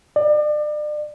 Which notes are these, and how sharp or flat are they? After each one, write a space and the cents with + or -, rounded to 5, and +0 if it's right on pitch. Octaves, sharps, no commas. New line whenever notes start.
D5 +35